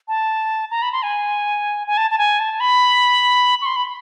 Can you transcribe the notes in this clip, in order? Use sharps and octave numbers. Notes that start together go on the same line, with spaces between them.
A5
A#5
B5
C6
G#5
G#5
A5
A5
G#5
A5
B5
C#6
C6
B5